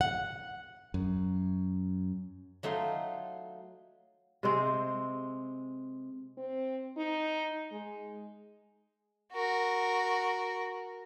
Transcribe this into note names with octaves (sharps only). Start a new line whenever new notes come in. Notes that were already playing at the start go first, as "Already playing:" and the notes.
F#5
F#2
F#3 A3 D#4 F4 C6
C3 G#3 C4
C4
D#4
G#3
F#4 A#4